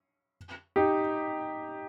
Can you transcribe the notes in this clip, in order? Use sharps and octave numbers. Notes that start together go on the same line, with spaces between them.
D#4 G4